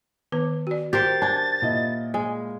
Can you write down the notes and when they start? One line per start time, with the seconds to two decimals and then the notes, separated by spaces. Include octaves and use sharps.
0.32 D#3 B3 B4
0.67 F#4 D5
0.93 G4 A#4 C5 A6
1.22 D4 A5 G6 G#6
1.62 A#2 E4 D#5
2.14 G#3